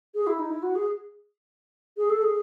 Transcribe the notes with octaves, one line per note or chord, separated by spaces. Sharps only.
G#4
E4
D#4
E4
F#4
G#4
G#4
A4
G#4